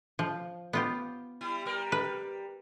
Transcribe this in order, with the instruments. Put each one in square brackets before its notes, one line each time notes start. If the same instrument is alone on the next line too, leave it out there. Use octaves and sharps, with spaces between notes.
[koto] F3
B3 F4 G4
[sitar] G3 E4
G3 A#4
[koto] B4